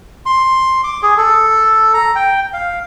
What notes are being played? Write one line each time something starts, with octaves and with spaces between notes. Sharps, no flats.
C6
D6
G#4
A4
A#5
G5
F5